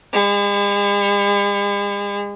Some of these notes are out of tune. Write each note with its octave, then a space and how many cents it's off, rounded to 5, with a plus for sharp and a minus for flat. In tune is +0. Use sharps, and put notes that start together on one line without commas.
G#3 -45